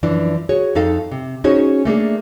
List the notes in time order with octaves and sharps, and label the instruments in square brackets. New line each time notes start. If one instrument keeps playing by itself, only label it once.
[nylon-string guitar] F#2 E3 F3 D4
F#4 G#4 C#5
F2 D#4 A4 F5
C3
C#4 D#4 F#4 G#4 C5 C#5
A3 A#3 D4 G#4